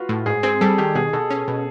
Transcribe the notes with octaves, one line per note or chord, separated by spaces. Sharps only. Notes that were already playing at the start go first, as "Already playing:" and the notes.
Already playing: F4 F#4 B4
A2
G#2 G#4
C4 G#4
G3 A4
D#3 G4
B2 G#4
B2 A4
C#4
B2